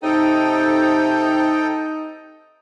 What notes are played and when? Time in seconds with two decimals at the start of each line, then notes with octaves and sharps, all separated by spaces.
0.03 C3 D#4 A4 G5